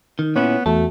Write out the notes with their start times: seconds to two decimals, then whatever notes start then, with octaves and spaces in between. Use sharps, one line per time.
0.19 D#3
0.36 A#2 B3 C#4 E4 C#5
0.66 E2 A3 F#4 A5